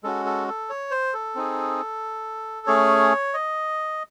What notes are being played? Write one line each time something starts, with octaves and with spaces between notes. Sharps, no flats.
G#3 C#4 F#4 A4
A4
A4
C#5
C5
A4
C4 D#4 G#4
A3 C#4 G#4 C#5
D#5